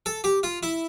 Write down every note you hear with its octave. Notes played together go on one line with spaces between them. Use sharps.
A4
G4
F4
E4